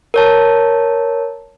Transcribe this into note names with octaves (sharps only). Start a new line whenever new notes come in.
A#4 C#5 A5